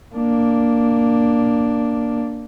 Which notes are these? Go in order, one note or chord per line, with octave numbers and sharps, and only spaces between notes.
A#3 D4